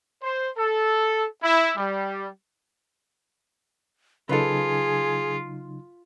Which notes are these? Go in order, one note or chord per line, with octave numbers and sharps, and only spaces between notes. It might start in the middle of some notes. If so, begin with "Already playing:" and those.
C5
A4
E4
G3
C#3 F#3 D#4 F4 G#4 A4 B4